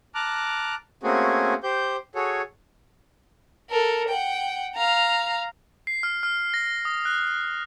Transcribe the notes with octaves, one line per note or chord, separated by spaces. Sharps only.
A5 A#5 D6 F6 F#6
A3 A#3 C4 C#4 F#4 G#4
G4 C5 G6
F#4 G#4 A4 C#5
A4 A#4
F#5 G5
F5 A#5
C7
F6
F6
A#6
D#6
F#6